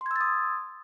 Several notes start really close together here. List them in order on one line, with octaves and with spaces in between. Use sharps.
C6 G#6 E6 A6 D#6